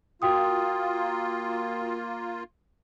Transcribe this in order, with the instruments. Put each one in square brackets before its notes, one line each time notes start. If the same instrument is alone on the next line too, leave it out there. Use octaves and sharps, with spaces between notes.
[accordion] A#3 F4 [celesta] F#4 G5 D#6